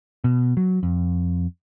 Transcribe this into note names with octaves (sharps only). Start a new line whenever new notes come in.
B2
F#3
F2